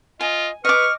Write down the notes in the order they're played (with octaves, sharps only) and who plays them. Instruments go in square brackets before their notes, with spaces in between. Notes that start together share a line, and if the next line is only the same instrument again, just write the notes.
[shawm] F4 [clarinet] D#5 [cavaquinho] G#5
[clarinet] B4 [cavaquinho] D#5 D6 [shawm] C#6 [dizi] F6